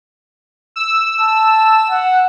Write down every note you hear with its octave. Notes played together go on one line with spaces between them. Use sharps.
E6
A5
F#5